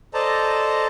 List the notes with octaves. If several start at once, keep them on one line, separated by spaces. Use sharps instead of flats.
A4 C5 D5 D#5 A5 A#5